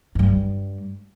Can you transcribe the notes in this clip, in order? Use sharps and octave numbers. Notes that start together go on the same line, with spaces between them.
G2 G3